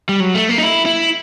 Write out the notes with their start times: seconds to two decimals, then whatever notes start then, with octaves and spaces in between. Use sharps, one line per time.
0.09 G3
0.20 F#3
0.34 A3
0.49 A#3
0.58 D#4
0.63 E4
0.86 E4